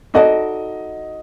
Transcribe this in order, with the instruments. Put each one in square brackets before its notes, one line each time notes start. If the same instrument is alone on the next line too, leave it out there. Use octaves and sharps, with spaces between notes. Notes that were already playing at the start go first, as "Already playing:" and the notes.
[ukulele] D#4 F#4 A4 D5 [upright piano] D#5